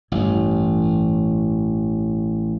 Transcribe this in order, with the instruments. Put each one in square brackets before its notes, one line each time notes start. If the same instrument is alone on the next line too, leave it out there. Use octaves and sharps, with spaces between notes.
[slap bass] A1 [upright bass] G2 E3